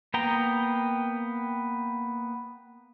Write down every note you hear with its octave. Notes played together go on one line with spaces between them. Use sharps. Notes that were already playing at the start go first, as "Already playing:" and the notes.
A#3 B3 G5 A#5